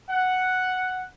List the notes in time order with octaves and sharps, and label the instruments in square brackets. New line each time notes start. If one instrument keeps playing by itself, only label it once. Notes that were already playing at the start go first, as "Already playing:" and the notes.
[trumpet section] F#5